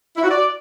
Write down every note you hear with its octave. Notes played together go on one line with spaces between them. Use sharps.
E4
F#4
D5